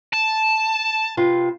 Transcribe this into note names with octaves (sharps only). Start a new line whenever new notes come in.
A5
C3 F4 B4